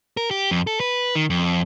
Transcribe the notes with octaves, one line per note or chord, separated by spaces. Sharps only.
A#4
G4
F2
A4
B4
D#3
F2